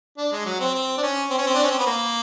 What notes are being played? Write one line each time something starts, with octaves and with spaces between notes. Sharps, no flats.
D4
G#3
F#3
C4
C4
D4
C#4
C4
C#4
C4
D4
C#4
C4
B3
A#3